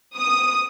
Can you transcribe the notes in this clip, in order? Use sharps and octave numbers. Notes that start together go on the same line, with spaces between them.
D#6